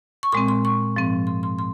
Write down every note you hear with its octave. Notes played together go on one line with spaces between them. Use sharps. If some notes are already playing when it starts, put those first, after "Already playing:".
C#6
A#2 G#3 C4 C6
C6
C#6
G#2 F3 C4
C6
C6
C6